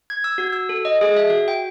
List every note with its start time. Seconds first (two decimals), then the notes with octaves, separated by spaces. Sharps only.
0.10 G#6
0.24 E6
0.38 F#4
0.52 E6
0.69 A4
0.85 D#5
1.01 G#4
1.16 E5
1.30 F#4
1.48 G5